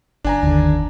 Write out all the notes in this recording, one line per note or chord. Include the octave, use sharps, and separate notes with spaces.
G1 D4 G#5 A#5
D#2 D3